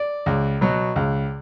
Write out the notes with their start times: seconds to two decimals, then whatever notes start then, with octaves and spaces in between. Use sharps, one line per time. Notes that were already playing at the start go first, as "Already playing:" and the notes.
Already playing: D5
0.26 C#2
0.61 B2 F#3
0.96 C#2